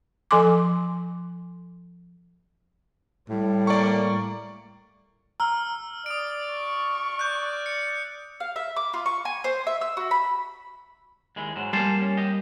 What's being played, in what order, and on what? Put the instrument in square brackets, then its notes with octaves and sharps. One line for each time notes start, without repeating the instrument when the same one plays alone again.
[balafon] F3 A4 G#5 C6 D6
[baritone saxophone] A2 [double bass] G3
[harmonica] A#3 [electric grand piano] D5 C#6
[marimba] A#5 [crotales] E6 F6
[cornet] D5 [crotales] D#6 D7
[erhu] C#6
[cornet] D5 [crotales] F#6 G6
[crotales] C#7
[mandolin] F5
E5
D6
F4
C#6
G#5
C5
E5
E6
F#4
B5
[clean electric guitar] D#2 G#3 E4
G#2 F#3 G#3
[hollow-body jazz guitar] G3 A#3 [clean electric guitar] G#5 A5 C6
[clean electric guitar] C#4
G4 D#5